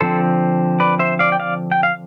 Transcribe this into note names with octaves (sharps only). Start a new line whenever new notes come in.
D3 F3 C4 A4 C5
B4 D5
C5 E5
D5 F5
G5
D5 F5
G5
F5